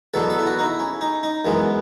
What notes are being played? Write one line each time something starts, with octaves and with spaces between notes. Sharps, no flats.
E2 B2 F#3 B3 A4
A4
E4
F#4
D#4
E4
C#4
D#4
D#4
F#2 E3 G#3 B3